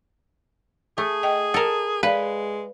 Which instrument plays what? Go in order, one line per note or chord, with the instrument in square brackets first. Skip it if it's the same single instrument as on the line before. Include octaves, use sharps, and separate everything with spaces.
[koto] A3 [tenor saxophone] G#4
[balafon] D#5 G5
[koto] A4 A#4
[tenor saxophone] G#3 [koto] B4 [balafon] D5 F5